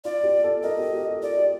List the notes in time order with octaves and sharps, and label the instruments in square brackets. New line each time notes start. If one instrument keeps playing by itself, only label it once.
[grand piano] F4 [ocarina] D5
[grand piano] G4
A4
[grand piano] A#4 [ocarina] D#5
[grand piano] G4
G4
A4
[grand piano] F4 [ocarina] D5
[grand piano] G4